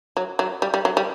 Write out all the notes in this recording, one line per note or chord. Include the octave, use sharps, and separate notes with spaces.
F#3
F#3
G3
G3
F#3
G3